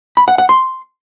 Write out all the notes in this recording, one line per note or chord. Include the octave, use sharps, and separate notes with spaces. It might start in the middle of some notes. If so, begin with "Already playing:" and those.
B5
F#5
F#5
C6